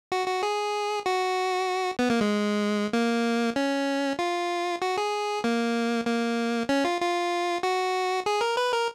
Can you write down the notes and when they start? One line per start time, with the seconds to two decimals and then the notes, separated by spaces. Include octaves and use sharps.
0.12 F#4
0.28 F#4
0.43 G#4
1.06 F#4
1.99 B3
2.10 A#3
2.21 G#3
2.93 A#3
3.56 C#4
4.19 F4
4.82 F#4
4.97 G#4
5.44 A#3
6.06 A#3
6.69 C#4
6.85 F4
7.01 F4
7.63 F#4
8.26 G#4
8.41 A#4
8.57 B4
8.73 A#4